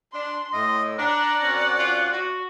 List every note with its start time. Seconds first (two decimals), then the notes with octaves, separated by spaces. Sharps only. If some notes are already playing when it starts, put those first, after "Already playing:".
0.13 D4 C6
0.53 A2 D#5
0.99 D4 D5 F#5 A#5
1.43 F#2 C4 C#4
1.79 F4
2.12 F#4